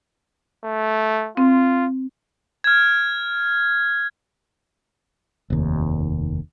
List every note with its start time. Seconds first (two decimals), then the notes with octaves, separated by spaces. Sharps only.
0.64 A3
1.37 C4 F4
2.64 F6 G#6
5.50 F1 D#2